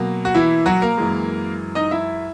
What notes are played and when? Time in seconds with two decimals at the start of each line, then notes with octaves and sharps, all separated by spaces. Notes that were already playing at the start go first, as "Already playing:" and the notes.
Already playing: B2 F#3 A#3
0.25 F#4
0.35 E3 E4
0.66 F#3 F#4
0.82 A#3 A#4
0.98 F#2 E3 G#3
1.75 D#4 D#5
1.91 E4 E5